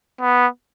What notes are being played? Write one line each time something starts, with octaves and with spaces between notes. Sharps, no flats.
B3